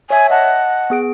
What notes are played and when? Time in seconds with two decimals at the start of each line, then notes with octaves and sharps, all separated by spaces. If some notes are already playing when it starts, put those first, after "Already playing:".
0.10 C#5 E5 G#5
0.30 D#5 F#5 A5
0.90 B3 G#4 D7